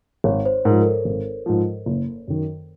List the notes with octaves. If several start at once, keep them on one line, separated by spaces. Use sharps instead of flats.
G#1 C#5
C5
G#2 F3 A#4
A#4
A4
G#1
G#2 F3
F#1
F#2 D#3